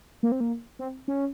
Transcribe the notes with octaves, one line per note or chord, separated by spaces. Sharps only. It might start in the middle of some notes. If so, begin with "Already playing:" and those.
A#3
C4
A#3
C4
C#4